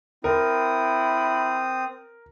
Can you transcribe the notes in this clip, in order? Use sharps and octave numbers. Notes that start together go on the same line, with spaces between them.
C4 E4 A#4 D#6